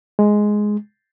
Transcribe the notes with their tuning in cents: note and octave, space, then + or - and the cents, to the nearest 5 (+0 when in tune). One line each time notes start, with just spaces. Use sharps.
G#3 +5